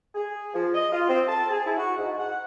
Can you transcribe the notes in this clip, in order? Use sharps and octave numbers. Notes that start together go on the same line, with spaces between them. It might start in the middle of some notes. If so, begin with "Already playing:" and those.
G#4
F3
D#5
F4
C4
A5
G#4
E4
F#4
G#2
F#5